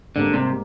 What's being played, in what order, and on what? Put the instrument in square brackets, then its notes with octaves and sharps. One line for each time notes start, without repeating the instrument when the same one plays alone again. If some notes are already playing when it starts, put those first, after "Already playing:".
[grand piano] G#2 G3 A#3 [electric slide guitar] D3
[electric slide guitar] C3